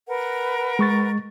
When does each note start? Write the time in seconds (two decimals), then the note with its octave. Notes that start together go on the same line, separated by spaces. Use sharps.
0.07 A#4 B4 F#5
0.79 G#3 C#6 A6